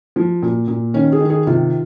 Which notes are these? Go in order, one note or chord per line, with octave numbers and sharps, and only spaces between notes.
F3
A#2
A#2
D#3 C#4
G#4
D#3
G#4
C3 F4